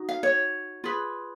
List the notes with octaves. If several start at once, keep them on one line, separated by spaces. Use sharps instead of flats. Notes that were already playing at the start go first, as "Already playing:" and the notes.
Already playing: D#4 F#4
F5
C#5
F4 G#4 B4